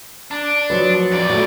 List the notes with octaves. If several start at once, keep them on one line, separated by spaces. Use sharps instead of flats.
D4
F3 F#3 B4
F2 D5
A3 F#4